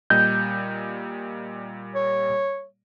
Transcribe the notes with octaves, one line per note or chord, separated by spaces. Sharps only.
A#2 G3 D#5 G6
C#5